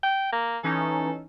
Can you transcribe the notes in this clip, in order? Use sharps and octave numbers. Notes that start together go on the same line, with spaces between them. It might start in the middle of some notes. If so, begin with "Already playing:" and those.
G5
A#3
E3 C#4 D#4 A4